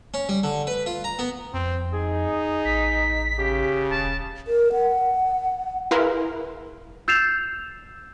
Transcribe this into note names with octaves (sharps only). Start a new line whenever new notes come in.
C#4
G3
D3
B4
F4
A#5
B3
F2 C4
D#4 G#4
A1 B6
C#3 G4
D#1 A5
A#4
F#5
E4 G#4 A#4 B4 F5 C6
E6 G6 A6 C7 E7 F7